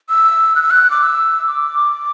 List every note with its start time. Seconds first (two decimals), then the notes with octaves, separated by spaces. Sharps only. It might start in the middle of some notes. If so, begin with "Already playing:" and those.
0.10 E6
0.56 F#6
0.62 E6
0.71 F#6
0.90 D6
1.01 E6
1.47 D6